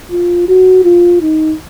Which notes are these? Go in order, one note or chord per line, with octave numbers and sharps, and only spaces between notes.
F4
F#4
F4
D#4